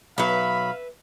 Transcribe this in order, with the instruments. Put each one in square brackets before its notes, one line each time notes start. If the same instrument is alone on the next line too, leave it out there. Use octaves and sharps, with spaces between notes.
[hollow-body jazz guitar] B1 F#3 [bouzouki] B4 E5 [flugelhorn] F5 [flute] B5